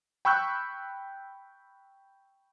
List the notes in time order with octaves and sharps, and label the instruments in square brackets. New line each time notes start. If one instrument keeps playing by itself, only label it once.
[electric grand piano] G5 B5 C#6 E6 F#6 G6